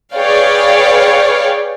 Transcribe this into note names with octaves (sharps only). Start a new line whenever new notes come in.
G#4 B4 C#5 D5 F5 G5